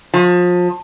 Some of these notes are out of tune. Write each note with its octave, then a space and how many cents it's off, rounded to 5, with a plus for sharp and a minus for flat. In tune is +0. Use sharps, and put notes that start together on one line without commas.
F3 +30